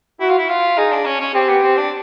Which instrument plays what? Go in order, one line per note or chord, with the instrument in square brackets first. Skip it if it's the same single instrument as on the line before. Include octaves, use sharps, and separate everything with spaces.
[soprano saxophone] E4 [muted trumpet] F#4
[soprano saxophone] F4
E4
F4
[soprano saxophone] D#4 [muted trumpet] G#4
[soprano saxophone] D4
C#4
C#4
[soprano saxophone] C4 [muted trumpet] G4
[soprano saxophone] B3
C4
D4